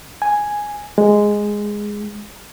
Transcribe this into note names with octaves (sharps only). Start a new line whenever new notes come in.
G#5
G#3